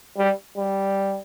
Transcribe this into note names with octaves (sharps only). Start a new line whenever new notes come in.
G3
G3